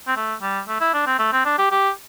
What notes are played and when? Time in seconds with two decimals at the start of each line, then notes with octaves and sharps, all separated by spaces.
0.08 C4
0.16 A3
0.42 G3
0.68 A3
0.80 E4
0.94 D4
1.07 C4
1.19 A3
1.32 C4
1.45 D4
1.58 G4
1.71 G4